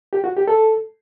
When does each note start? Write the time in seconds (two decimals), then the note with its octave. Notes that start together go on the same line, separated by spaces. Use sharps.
0.13 G4
0.24 F#4
0.37 G4
0.48 A4